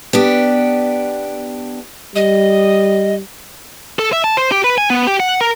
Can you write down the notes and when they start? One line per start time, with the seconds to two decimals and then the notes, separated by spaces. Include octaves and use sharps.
0.13 B3 D4 G4
2.15 G3 D#5
3.99 A4
4.13 E5
4.24 A5
4.37 C5
4.52 G4
4.64 B4
4.78 G#5
4.90 B3
5.07 G4
5.20 F#5
5.41 A#4